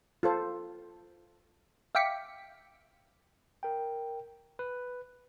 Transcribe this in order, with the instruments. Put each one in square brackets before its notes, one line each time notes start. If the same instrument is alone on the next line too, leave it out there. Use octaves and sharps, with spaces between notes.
[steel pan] F4 A4 C5
[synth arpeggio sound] E5 F5 G5 D6 B6 C#7
[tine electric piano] A#4 G5
B4